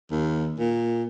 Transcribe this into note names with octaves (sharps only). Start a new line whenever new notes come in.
D#2
A#2